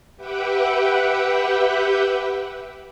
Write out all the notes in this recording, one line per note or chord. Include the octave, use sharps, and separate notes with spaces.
G4 B4 E5 F#5 G5